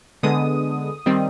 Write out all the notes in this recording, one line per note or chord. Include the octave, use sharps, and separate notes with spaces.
D3 G#3 B3 D#6
D#3 G3 C4